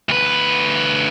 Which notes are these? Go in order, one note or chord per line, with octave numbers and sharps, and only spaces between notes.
D2 B4